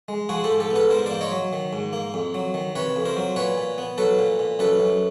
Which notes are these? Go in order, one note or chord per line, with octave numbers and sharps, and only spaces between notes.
G#3
F3 F#4 G#4
G4 A4
G#2
G4 A4
B3
A4 B4
G#2 A#4 C5
A#3 C5 D5
C#5 D#5
F#3
D#3
G#2
A#3
F2
F#3
D#3
C3 B4 C#5
F2
A#4 C5
F#3
A#2 B4 C#5
A#2
B3
F#3 A4 B4
A#2
A#2
F#2 A4 B4
F#2